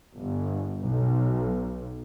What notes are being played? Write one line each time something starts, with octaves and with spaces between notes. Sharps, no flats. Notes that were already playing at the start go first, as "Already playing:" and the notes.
G1
B1